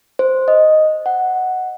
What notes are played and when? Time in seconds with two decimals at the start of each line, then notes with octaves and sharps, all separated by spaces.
0.19 C5
0.48 D#5
1.06 F#5